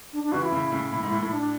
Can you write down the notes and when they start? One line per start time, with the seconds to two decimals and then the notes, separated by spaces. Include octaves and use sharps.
0.13 D4
0.23 D4
0.32 C#3 E3 F#4
0.43 E4
0.52 A2 C#3
0.72 A2 C#3
0.93 A2
1.03 G#2
1.12 A2
1.23 A2
1.32 D4